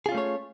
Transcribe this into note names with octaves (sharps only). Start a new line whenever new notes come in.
A3 C#4 F4 G#4 C#5